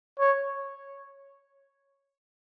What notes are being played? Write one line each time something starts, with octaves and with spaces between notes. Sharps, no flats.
C#5